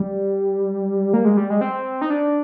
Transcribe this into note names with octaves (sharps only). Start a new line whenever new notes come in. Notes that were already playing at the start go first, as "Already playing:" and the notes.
Already playing: G3
A#3
G#3
G3
G#3
C4
D#4
D4